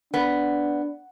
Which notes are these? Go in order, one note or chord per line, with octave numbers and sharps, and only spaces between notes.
B3 D4